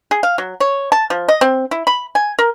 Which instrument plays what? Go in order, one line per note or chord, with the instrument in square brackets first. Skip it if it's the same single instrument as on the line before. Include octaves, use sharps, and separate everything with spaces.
[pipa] G#4
F5
F#3
C#5
A5
F3
D#5
C4
E4
B5
G#5
A#4